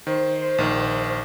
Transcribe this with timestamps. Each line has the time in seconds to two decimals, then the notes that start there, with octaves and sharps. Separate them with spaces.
0.07 D#3 C5
0.58 A#1 D#3